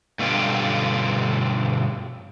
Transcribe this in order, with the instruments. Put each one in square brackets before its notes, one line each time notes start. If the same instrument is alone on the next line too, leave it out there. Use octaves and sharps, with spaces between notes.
[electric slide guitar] G2 B2 D3 C#4 F4 G4